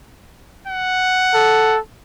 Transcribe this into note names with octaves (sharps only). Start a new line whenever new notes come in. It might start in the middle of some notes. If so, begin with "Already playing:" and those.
F#5
A4